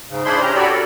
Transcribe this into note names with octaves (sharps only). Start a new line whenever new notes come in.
G#2 C#3
D4 E4 G#4 C5 B5 C6
C#4 G4 A#5
F#4 G4 A4 C#5 D5 B5
A4 A#4